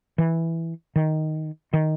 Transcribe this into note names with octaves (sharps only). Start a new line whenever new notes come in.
E3
D#3
D#3